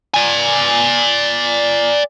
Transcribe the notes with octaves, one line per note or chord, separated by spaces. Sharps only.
D5 G#5